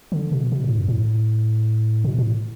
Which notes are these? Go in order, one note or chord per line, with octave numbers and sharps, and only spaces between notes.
D3
B2
B2
A2
F#2
A2
B2
A2